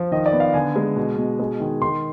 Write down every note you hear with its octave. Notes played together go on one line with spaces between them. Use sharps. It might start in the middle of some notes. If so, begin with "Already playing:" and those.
Already playing: F3
D#3 D#5
D5
B3
F5
D3 G#5
G#3
B2
B2
G#3
D#3
D#3 C6